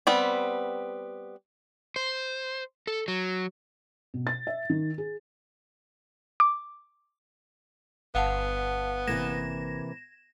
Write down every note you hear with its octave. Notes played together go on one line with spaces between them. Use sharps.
G3 B3 C4
C5
A4
F#3
B2
A6
E5
D#3
G#4
D6
G1 B3 F5 F#5 A5
C3 E3 A#3 G#6 A#6 E7